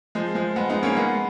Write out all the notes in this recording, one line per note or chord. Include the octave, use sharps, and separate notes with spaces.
F3 G#3
F3 G#3
G#3 B3
B3 D#4
A#3 C#4
G#3 B3